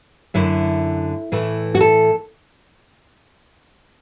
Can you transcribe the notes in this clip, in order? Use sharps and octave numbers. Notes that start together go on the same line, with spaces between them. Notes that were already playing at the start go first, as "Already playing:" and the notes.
F#2 D3 A3 E4
A2 E3 A3
F#4
A4